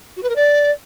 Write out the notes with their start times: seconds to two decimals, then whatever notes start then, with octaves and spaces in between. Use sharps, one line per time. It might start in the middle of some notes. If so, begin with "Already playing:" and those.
0.17 F#4
0.23 B4
0.29 A#4
0.36 D5